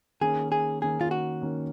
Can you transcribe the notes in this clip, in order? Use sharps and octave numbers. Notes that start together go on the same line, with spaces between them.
D#3 A#3 C#4 G#4
G#4
D#3 A#3 C#4 G#4
F4
F#4
D#3 A#3 C#4